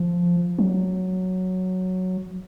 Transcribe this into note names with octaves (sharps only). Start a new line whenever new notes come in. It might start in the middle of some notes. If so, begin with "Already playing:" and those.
Already playing: F3
F#3